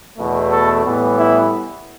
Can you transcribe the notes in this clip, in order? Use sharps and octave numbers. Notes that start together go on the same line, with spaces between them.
E2 B2 A3
A4
A2 E3 G3 B3
E4